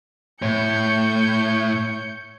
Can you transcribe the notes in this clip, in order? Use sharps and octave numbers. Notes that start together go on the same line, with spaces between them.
A2 C#5 G6 C#7